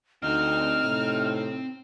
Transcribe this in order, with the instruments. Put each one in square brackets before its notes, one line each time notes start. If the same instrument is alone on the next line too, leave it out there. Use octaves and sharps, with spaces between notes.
[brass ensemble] D2 [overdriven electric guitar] C4 G5 [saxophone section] D#4 [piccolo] F6
[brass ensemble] A2 C3